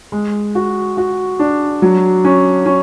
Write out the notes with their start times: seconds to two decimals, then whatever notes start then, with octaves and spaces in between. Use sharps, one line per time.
0.12 G#3
0.55 F#4
0.97 F#4
1.39 D4
1.82 F#3
2.25 C#4
2.66 C#4